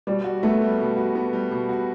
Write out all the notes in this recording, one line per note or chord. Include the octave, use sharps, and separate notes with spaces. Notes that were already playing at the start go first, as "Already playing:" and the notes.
B2 G3
F#4
A3 B3
G3
B2
F#4
B3
G3
B2
F#4